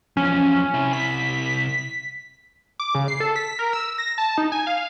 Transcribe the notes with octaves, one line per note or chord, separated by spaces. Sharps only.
E2 F3 C#4
C3 E4
B6
D6
C#3
C7
A4
B6
A#4
E6
A#6
A5
D#4
G#5
F5